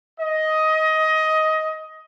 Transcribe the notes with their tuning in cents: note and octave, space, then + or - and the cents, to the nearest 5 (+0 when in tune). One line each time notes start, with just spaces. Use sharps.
D#5 +15